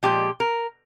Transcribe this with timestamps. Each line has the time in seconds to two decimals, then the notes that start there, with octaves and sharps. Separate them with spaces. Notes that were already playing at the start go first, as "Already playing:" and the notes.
0.03 A#2 F3 G#3 G4
0.40 A#4